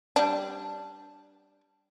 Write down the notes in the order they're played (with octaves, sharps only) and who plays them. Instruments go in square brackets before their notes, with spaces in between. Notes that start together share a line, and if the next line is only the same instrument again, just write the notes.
[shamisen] G3 D4